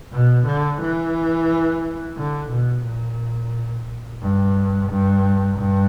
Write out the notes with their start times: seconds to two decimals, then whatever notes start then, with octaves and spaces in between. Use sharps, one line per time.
0.12 B2
0.47 D3
0.81 E3
2.17 D3
2.51 B2
2.85 A#2
4.21 G2
4.90 G2
5.58 G2